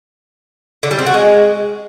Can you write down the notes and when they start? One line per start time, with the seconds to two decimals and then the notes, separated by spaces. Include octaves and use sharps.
0.83 D3
0.91 G3
0.99 C4
1.06 F#4
1.14 G#3